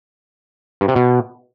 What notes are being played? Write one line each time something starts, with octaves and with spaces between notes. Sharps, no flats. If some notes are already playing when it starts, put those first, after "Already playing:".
G2
C3
B2